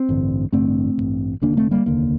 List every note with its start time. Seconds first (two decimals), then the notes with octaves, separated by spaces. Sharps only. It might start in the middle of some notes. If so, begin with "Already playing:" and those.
Already playing: C4
0.09 A1 G2 D3
0.52 A1 G2 D3 A3 C4
0.98 A1 G2 D3
1.41 F1 D#2 D3 A#3 D4
1.57 A3 C4
1.71 G3 A#3
1.86 F1 D#2 D3 A#3